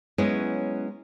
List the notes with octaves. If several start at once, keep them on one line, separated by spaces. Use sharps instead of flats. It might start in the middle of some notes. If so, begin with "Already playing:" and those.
F#3 G#3 B3 C#4 E4 C#5